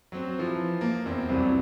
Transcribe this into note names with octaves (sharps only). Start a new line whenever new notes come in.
F#3 C4
E3 F3
A#3
E2 C4
C2 F2 C3 E3 F#3 G3